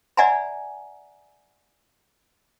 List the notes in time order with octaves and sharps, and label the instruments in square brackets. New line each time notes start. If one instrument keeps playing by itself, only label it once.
[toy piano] D5 E5 F#5 G#5 A#5 B5